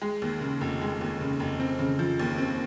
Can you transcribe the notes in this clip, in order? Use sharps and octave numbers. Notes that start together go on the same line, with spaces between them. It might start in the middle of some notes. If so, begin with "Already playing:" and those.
G#3
D#2
C#3
F1
G#3
D#2
C#3
F1
C4
C#3
F3
D#2
C4